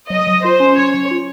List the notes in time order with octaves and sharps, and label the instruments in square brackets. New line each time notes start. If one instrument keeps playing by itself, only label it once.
[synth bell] F#3 [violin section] D#5
[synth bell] F#3
[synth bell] F4 [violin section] C5
[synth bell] C#4
[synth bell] F#3 [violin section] C#5
[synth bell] F#3
F4